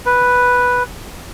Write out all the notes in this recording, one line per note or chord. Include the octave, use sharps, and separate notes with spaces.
B4